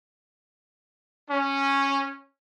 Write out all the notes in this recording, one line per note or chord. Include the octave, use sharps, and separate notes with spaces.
C#4